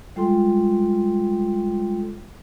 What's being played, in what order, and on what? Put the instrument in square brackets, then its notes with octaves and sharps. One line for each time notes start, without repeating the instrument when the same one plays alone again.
[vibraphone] G3 G#3 F4 A4 G5 C6